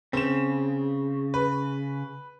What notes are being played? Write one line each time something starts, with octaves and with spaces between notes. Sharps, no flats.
C#3 C4 E7
B4